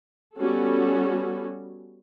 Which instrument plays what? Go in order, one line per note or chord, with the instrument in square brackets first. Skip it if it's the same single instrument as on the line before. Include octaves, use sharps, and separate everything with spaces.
[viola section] G3 B3 C#4 F#4 A4